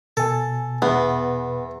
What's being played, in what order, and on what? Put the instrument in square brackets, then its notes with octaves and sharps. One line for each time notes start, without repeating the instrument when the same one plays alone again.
[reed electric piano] B2 G#5 [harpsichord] A4
[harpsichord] E2 [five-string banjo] B3